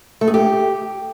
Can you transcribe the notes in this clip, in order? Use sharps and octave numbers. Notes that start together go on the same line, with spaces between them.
A3
G#4
G4